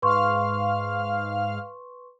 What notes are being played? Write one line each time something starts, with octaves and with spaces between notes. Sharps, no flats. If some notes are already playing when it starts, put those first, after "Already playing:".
G#2 B4 F5 C6 C#6 F6